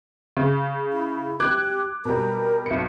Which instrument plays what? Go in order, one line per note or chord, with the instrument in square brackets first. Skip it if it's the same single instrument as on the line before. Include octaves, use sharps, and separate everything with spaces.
[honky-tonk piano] C#3
[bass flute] E4
[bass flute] G4 [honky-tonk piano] D6 F#6 G#6
[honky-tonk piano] B2 G3 [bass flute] A#4
[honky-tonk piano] B1 C#7